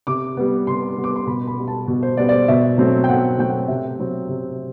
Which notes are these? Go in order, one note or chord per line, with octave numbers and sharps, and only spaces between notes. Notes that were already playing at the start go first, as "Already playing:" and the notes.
C3 D6
G3 B3
C3 C6
G3 B3
D6
C6
B2 B5
B5
G3 B3
A5
B2
C5
G3 B3 D5
D5
C5
B2 E5
F#3 A3 C4
G5
B2 F#5
F#3 A3 C4 G5
F#5
C3 E5
F#3 C4
C3